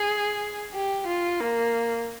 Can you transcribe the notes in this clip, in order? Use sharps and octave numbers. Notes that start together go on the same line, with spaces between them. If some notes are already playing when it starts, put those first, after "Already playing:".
Already playing: G#4
G4
F4
A#3